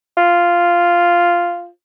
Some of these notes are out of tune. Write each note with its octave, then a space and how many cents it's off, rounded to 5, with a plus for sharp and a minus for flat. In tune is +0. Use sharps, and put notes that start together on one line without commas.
F4 -5